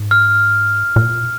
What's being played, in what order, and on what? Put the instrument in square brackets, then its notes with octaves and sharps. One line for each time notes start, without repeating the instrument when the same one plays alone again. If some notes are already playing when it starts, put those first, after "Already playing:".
Already playing: [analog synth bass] G#2
[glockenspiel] F6
[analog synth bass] A#2